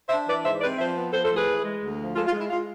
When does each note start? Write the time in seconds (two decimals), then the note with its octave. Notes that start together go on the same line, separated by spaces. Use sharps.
0.09 D4 C5 E5
0.27 E3 B4 D5
0.44 G#2 C5 E5
0.61 C4 B4 D5
0.79 F3 C5 E5
0.96 B3
1.13 F3 A4 C5
1.24 A4 C5
1.30 A2
1.36 G#4 B4
1.47 E3
1.65 G#3
1.82 D2
1.99 F3
2.16 G#3 F4 A4
2.27 F4
2.32 G#3
2.39 E4
2.50 G#3 F4